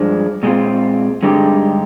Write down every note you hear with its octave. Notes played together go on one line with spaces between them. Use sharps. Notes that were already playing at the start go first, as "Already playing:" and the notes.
Already playing: G2 F3 G#3 D4
A#2 G#3 C4 F4
G2 D3 G#3 D#4 G4